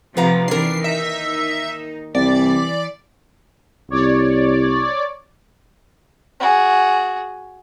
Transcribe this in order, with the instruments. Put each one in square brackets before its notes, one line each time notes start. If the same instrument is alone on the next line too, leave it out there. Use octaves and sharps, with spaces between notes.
[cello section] C3 F3 A3 [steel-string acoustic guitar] B4 F5 A#5
[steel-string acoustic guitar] D#2 A#4 [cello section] E3 D4 [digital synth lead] C7
[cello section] D#4 [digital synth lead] E5
[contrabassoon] C2 [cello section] E3 [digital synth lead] D5
[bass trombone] C2 [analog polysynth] C#5 D5
[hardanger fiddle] F#4 G#4